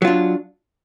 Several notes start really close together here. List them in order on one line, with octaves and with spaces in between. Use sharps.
F#3 F4 D4